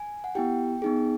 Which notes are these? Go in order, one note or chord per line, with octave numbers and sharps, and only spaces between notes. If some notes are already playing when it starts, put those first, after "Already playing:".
Already playing: G#5
F#5
B3 E4 G4 G5
B3 D#4 G#4